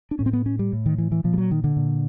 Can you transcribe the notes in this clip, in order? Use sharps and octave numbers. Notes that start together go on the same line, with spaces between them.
D4
A2 C#4
C4
B3
C#4
G3
A2
D#3
E3
E3
A#2 F3
G3
F#3
D#3
D3
A#2